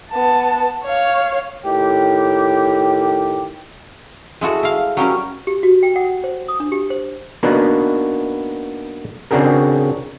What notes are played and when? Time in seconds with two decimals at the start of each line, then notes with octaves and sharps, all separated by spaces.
0.12 B3 A5
0.85 C#5 F5
1.64 A2 D#3 G4
4.41 G#3 E4 F#4 A4
4.63 E4 F5
4.97 F#3 G3 C#4 A#4
5.47 G4
5.63 F#4
5.83 G5
5.96 F#5
6.24 C5
6.48 D#6
6.60 D4
6.72 G4
6.90 C5
7.43 A#3 B3 D4 D#4 F#4 B4
9.31 C#3 C4 D4 F#4 G#4 A#4